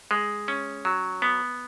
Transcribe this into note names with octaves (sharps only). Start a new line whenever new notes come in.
G#3
C#4
F#3
B3